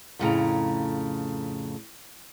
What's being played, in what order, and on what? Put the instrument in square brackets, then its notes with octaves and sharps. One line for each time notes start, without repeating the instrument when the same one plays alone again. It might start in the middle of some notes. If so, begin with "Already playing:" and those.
[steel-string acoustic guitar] F2 A2 C#3 A#5